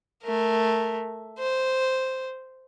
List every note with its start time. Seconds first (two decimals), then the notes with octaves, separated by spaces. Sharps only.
0.24 A3 A#4
1.39 C5